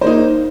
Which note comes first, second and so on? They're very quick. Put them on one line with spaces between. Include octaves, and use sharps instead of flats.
C5 A#3 D#4